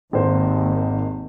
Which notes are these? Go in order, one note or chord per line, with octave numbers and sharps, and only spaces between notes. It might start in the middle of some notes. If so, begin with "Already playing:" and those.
G#1 D#2 D#4 C5